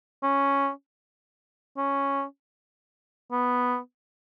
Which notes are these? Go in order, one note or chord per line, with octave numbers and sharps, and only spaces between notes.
C#4
C#4
B3